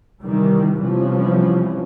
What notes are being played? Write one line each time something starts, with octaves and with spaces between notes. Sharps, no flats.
C3 D#3 E3 G3
C3 E3 F3 G3 B3 C#4